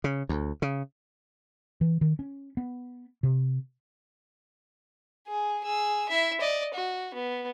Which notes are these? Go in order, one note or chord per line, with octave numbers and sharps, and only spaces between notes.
C#3
D2
C#3
E3
D#3
C#4
B3
C3
G#4
G#4 E6
E4 E5
D5 D#5
F#4
B3